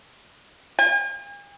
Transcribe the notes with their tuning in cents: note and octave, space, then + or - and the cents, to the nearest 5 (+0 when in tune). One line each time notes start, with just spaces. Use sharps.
G#5 -45